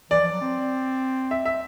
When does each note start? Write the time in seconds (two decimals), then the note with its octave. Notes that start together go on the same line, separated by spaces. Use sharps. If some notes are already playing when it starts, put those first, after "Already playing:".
0.11 E3 D5
0.21 F3
0.32 F#3
0.41 C4
1.31 E5
1.45 E5